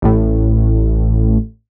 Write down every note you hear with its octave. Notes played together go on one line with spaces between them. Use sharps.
A1 A2